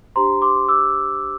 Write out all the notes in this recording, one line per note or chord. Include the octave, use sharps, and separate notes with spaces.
D4 G4 C5 A#5 C6
C6 D6
D6 E6